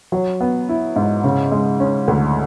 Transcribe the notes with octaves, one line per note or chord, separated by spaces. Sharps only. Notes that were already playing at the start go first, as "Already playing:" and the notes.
F#3
B3
E4
G#2
C#3
G#3
C#4
D2